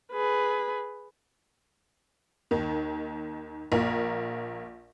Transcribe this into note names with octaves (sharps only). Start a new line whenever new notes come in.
G#4 B4
D#2 D#3
A#1 A#3 A#4